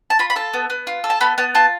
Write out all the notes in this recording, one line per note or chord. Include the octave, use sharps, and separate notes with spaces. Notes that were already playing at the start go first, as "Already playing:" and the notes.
A5
F4 B5
B5
A4 A5
B3
B3
F4
A4
A5
B3 B5
B3 A5
F4 A5